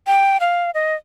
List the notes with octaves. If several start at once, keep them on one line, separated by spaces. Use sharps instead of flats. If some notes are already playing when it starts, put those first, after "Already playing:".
G5
F5
D#5